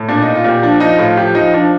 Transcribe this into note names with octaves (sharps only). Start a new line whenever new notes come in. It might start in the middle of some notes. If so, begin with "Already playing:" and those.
Already playing: A2
A#2 D4
A#2 D#4
F4
A#2 G4
F3 D4
F3 D#4
A2 F4
F4
F3 G4
F3 D#4
F3 D4